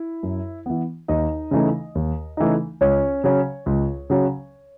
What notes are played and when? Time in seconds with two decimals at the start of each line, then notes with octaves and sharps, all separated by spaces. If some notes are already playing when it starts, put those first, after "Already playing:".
Already playing: E4
0.23 F#2
0.66 E3 B3
1.08 D#2 D#4 D#5
1.51 C#3 E3 A3 D#4
1.95 D#2
2.37 C#3 E3 A3 D#4
2.81 C#2 C#4 C#5
3.24 C#3 F#3 C#4
3.66 C#2
4.10 C#3 F#3 C#4